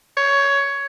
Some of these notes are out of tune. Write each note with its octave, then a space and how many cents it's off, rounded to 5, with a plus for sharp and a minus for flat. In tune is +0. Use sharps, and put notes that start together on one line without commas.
C#5 +15